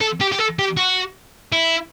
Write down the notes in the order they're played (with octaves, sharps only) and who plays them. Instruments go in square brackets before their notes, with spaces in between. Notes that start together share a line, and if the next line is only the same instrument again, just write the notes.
[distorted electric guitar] A4
G4
G4
A4
G4
F#4
E4